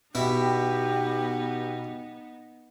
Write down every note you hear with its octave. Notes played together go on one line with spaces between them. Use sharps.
B2 B3 D#4 E4 G4 B5